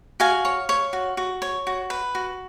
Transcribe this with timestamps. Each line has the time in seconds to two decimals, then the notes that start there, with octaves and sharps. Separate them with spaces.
0.20 F#4 F5 G#5
0.45 C#5
0.69 C#5
0.93 F#4
1.17 F#4
1.42 C#5
1.67 F#4
1.90 B4
2.15 F#4